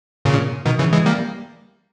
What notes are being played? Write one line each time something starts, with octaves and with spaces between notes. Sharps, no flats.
A#2 C#3
B2 D#3
C#3 E3
E3 G#3
G3 A#3